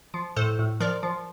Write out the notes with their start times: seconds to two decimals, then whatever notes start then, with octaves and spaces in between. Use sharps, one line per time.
0.14 F3
0.36 A2 A4 C5
0.59 A2
0.80 F3 A#4 D5
1.03 F3